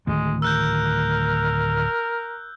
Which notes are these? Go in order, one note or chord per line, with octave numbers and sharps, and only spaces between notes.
D1 D#3 G#3 A3
A#4 E6 F#6 G6